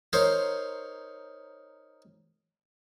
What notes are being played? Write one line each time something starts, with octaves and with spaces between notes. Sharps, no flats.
D#4 A#4 C5 C#5